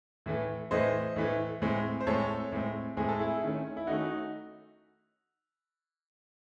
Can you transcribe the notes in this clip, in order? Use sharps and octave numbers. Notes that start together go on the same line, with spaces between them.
A2 E3 A3
A2 E3 A3 C5 D#5
A2 E3 A3
A2 G#3 C4
C5
A2 G#3 C4 A4 C#5
A2 G#3 C4
A2 G#3 C4 G#4
A4
E4 G#4
D#3 A3 C#4
E4
D#3 A3 C#4 D#4 F#4